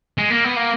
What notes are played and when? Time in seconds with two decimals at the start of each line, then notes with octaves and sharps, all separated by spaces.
0.18 G#3
0.30 A#3
0.44 B3
0.56 A#3